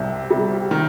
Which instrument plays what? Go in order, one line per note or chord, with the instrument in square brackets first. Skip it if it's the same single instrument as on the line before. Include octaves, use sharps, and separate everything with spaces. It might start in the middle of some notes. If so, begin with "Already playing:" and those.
Already playing: [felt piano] C2 C3
C3 G3
[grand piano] D#3